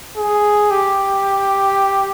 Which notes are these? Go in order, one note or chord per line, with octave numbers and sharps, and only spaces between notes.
G#4
G4